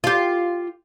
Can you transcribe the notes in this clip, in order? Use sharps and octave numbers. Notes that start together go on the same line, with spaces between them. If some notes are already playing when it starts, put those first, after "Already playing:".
F4 G4